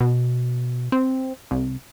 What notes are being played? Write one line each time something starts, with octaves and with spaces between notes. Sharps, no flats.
B2
C4
C2